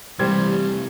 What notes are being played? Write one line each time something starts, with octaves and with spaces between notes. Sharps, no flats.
C3 E3 G3 A3 G4 C5 G#6